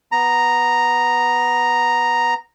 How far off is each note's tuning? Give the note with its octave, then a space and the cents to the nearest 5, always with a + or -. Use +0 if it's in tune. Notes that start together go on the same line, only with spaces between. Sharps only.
B3 +0 A#5 +0